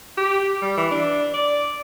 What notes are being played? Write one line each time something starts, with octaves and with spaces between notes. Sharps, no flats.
G4
G3
E3
D4
D5